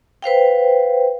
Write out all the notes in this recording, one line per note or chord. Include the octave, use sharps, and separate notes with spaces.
B4 C5 F5 G5